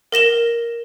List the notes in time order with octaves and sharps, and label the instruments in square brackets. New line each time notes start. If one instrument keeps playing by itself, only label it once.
[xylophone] A#4 A#6 E7 G7